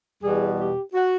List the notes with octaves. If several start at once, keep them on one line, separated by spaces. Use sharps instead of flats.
E2 B2 G3 G#4
G4
F#4